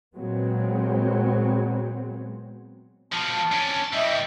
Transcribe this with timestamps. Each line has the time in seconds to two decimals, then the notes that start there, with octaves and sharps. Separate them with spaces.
0.16 A#2 F#3 G#3 B3 C4
3.12 B2 F3 A5
3.52 C#4 D4
3.94 E3 G3 D#5 E5